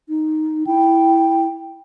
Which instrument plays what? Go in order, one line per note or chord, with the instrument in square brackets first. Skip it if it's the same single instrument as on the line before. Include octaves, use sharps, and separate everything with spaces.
[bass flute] D#4
[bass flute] E4 [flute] G5